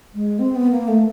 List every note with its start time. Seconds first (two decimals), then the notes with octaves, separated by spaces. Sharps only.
0.14 G#3
0.39 C4
0.55 B3
0.71 A#3
0.88 A3